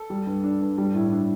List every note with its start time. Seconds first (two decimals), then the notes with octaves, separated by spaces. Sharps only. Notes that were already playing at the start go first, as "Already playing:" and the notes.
Already playing: A4
0.10 G3
0.27 G2
0.44 D4
0.61 G2
0.78 G3
0.94 A2
1.12 D4